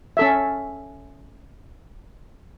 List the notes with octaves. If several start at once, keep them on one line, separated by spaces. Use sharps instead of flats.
C#4 A4 E5